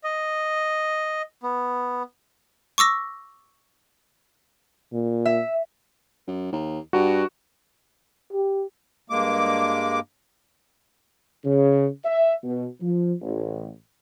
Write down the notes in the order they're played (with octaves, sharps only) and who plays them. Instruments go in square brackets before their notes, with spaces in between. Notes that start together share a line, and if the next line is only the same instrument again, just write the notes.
[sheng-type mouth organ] D#5
B3
[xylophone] C#6 D6 E6 A#6
[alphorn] A#2
[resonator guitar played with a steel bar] E5
[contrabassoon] F#2
D#2
[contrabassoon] G2 [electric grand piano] F#4
[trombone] G4
[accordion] G2 G#3 A#3 D6
[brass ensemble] C#3
E5
B2
F3
A1